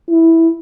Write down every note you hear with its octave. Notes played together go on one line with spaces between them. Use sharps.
E4